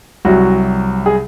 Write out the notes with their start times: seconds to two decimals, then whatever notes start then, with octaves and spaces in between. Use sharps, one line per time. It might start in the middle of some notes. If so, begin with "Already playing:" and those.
0.25 C2 C3 F#3 F#4
1.06 G#4